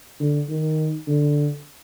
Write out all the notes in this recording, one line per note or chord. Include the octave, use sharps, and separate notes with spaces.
D3
D#3
D3